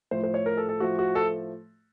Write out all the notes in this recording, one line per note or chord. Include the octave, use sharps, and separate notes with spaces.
A2 F3 A3 C5
C5
C#5
A#4
A4
A4
A2 F3 A3 F#4
F#4
A4